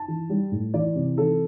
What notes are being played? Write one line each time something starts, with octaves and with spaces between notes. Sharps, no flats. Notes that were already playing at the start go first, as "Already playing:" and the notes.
Already playing: A5
E3
G3
A2
E3 D5
C3
E3 A4